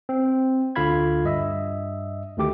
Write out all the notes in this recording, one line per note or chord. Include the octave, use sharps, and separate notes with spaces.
C4
D2 D3 F4 F5 B5 G#6
G2 D#5 E5
D2 D#3 A3 G4 D6